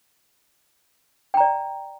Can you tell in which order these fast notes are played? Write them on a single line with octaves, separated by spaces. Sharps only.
G5 A#5 D5